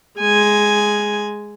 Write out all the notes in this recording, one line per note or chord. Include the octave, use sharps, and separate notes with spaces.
G#3 G#5